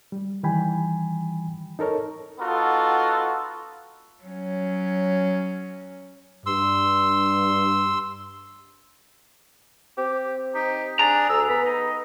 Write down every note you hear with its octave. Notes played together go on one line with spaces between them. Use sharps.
G3
D#3 E3 G3 G5 G#5 B5
D#4 A4 A#4 C#5
B3 D#4 F4 F#4 A4
F#3 C#4
G2 C6 E6
C4 G4
D#4 G4
D4 G#4 A#5
D2 G#4 E6
B3 B5
D#4 D#5